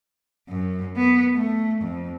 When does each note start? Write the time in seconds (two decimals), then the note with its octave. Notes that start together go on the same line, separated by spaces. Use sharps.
0.50 F#2
0.96 B3
1.34 A3
1.81 F2